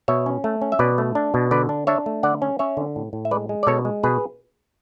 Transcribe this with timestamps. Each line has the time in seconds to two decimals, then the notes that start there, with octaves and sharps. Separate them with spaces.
0.08 B2 C#5 E5
0.26 C#4
0.44 A3
0.62 C#4
0.72 E5
0.79 B2 B4 D5
0.98 A3
1.15 D4
1.34 B2
1.51 D3 B4 D5
1.69 D4
1.87 D4 C#5 E5
2.06 A3
2.23 D3 D5 F#5
2.42 C#4
2.59 C#4 C#5 E5
2.77 D3
2.96 A2
3.13 A2
3.25 E5
3.31 G#3 B4 D5
3.49 G#3
3.63 D5
3.67 B2 A4 C#5
3.85 G#3
4.03 B2 G#4 B4